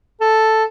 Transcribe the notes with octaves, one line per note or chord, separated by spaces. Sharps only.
A4